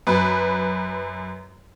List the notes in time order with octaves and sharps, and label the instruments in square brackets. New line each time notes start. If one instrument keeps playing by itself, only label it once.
[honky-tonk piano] F#2 B4